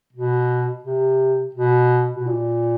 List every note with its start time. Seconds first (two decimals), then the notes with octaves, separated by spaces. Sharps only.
0.13 B2
0.84 C3
1.55 B2
2.16 B2
2.27 A#2